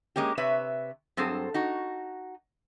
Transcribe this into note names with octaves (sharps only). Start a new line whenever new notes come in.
G#3 A#3 C#4 G4
C3 B4 C#5 E5
G2 F#3 C4 G#4 A4 C5
D#4 F#4